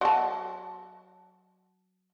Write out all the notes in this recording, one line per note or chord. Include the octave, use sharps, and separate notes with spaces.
F#3 A5